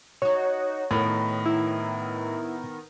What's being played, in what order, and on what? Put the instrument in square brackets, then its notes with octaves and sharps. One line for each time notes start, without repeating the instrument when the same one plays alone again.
[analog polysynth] D#4 F#4 [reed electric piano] C#5
[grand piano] A2 [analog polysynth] D#3 B3 A#4
[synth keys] E4